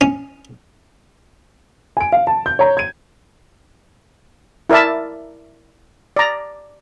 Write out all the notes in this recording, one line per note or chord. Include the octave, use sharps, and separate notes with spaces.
C#4
G#5 D7
F5
A5
G6
C#5 A#5
G#6 D#7
E4 A#4 D5 E5 A5
D5 A#5